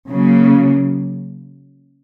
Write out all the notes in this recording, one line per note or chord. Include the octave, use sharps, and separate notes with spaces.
C#3 F#3 A#3